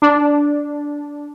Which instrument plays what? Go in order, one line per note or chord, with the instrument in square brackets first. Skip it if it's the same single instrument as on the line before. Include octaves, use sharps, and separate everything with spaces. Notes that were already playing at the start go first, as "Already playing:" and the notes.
[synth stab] D4